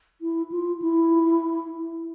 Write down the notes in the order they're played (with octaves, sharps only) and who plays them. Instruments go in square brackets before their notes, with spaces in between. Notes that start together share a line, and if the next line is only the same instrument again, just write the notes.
[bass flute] E4
F4
E4